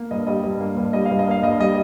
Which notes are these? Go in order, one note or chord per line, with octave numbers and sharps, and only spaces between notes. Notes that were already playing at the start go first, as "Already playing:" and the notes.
Already playing: A#3
G2 D#5
G3 D#5
G2
A#3
G2
G3 D#5
F5
G2
D#5
A#3 F5
G2 D#5
G3 D#5